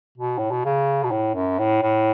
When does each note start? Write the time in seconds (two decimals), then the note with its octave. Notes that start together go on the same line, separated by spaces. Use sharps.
0.18 B2
0.38 A2
0.51 B2
0.65 C#3
1.04 B2
1.11 A2
1.35 F#2
1.59 A2
1.82 A2